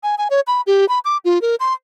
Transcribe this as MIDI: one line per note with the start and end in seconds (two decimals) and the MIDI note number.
0.03 0.15 80
0.18 0.28 80
0.30 0.40 73
0.47 0.61 83
0.67 0.88 67
0.89 0.99 83
1.05 1.17 86
1.25 1.41 65
1.41 1.55 70
1.60 1.74 84